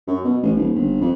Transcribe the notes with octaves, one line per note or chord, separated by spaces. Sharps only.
F#2
B2
A1
D#1
G1
F2